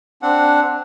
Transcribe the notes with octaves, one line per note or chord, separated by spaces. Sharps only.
C4 D4 F#5